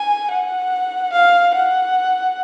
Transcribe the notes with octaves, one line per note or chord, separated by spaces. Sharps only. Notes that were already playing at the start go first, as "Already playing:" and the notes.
Already playing: G#5
F#5
F5
F#5